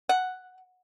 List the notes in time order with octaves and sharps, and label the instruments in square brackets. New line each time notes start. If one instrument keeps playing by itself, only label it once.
[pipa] F#5